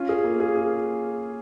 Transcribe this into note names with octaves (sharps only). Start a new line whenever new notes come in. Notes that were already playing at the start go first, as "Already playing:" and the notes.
Already playing: C#4 F4
G#4
A#3
G#4
G#4